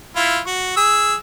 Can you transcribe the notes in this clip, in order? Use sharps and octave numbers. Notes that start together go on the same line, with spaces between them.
E4 F4
F#4
G#4 E6